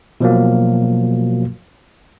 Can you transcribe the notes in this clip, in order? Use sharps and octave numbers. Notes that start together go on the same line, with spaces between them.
B2 F3 F#3 A#3